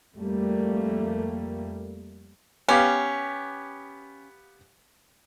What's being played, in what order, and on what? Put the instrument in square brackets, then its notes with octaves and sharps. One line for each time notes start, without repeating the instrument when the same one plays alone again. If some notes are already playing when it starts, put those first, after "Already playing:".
[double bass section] F2 G3 A3 A#3
[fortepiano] B3 G4 F5 [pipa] C#4